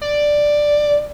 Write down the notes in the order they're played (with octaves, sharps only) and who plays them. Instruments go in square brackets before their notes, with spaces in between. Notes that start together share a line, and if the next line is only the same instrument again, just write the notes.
[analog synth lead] D5